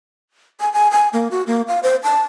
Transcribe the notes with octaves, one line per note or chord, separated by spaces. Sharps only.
G#5
G#5
G#5
A#3
F#4
A#3
F5
C5
A5